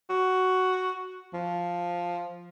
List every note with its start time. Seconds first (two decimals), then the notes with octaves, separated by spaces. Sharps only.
0.10 F#4
1.34 F3